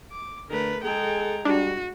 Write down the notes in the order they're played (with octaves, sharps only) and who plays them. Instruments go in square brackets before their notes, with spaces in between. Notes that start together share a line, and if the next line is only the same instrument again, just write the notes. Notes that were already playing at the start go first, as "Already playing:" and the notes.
[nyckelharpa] D6
[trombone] D3 [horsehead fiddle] A3 B4 [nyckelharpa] A#4
[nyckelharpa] G#3 A#5 [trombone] G#4 [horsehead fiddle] A4 G5
[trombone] G3 [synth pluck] D4 [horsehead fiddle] F#4